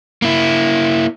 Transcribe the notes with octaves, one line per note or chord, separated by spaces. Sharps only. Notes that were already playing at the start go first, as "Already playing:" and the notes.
A#3 E4